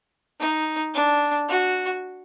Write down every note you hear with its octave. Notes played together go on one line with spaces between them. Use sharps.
D#4
D4
F#4